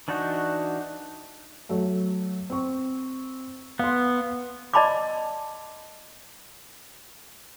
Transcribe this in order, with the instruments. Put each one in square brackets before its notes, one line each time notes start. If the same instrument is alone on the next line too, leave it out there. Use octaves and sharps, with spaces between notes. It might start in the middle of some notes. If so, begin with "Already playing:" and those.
[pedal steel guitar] E3 D4 D#4 F#4
[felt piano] F#3 A3
C4 C#6
[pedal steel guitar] B3 [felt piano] F5 C6
[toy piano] D5 D#5 A5 B5 C6 D6